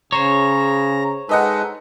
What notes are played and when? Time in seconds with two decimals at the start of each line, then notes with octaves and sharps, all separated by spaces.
0.12 C#3 C5 C#5 A#5
1.29 G#3 D#4 A4 B4 D#5 F#5